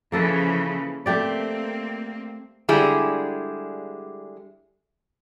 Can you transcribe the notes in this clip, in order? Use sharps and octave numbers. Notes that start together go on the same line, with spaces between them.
C#3 E3 F3 A#3 A4 B4
A3 A#3 C4 G4 D5
D3 G3 G#3 E4 G#4